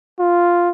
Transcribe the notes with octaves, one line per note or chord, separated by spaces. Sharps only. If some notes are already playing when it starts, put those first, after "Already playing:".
F4